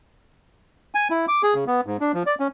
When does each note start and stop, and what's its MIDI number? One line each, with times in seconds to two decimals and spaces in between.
0.95 1.08 80
1.10 1.26 64
1.28 1.42 86
1.43 1.54 68
1.54 1.64 49
1.67 1.81 59
1.86 1.97 44
2.00 2.12 62
2.14 2.23 53
2.26 2.35 74
2.40 2.48 61